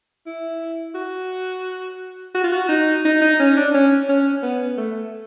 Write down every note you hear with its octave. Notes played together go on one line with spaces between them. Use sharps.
E4
F#4
F#4
F4
F#4
D#4
D#4
D#4
C#4
D4
C#4
C#4
B3
A3